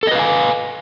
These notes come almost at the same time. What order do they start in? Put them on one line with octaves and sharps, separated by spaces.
A4 D#5 B4 F5 G#5